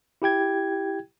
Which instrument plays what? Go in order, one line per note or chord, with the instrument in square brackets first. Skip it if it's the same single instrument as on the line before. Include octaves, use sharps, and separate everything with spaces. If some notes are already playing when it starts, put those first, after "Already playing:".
[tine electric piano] E4 G4 G5 G#6